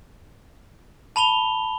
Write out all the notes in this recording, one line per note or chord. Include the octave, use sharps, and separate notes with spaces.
A5 B5 F7 G7